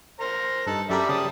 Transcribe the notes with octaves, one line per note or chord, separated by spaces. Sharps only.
A#4 C5 A#5
G2 D#4 A4 A5 F#6
F#2 G3 G4 A4 A#4 D5 E5 B5
C#3 A5 D#6